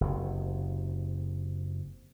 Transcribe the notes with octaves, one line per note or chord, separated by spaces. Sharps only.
F#1 C3